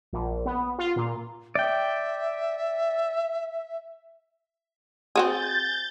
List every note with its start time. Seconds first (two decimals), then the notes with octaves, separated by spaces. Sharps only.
0.13 A#1
0.46 B3
0.78 F4
0.96 A#2
1.55 D5 E5 G5
5.16 C4 F#4 G#4 G6 A6